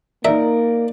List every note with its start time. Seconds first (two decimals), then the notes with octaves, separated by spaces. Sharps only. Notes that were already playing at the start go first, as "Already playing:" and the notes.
0.25 A#3 D#4 A#4 D5 E5